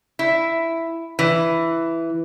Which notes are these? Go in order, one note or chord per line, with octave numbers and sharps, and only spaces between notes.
E4
E3